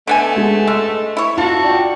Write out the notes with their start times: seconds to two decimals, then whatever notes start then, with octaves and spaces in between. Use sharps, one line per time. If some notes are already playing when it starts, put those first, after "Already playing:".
0.07 D3 A3 B3 G#5
0.36 G#3
0.67 G#3 E6
1.17 E4 C#5
1.38 F4 F#4 A5
1.64 D5 G5